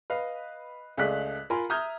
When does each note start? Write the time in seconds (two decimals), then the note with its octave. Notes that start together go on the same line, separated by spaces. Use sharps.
0.10 B4 D#5 F5
0.97 C#2 A3 G#4 D5 F#6 B6
1.50 F4 A#4 G#5 B5 C6
1.70 E5 A#5 D#6 F6 G6 G#6